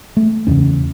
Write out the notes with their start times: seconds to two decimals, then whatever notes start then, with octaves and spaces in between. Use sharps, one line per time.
0.17 A3
0.47 E2 C#3 C#4